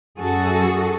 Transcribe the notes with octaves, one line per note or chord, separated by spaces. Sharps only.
F#2 F#4 G#4 A4